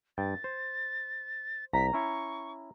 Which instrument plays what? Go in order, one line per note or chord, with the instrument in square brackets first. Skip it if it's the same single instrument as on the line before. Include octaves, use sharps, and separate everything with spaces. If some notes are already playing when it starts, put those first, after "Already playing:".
[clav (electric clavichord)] G2 G5 [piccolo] A6
[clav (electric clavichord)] C5
[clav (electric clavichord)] C2 [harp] A#5 [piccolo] B6
[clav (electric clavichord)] C#4 E4 [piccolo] C#6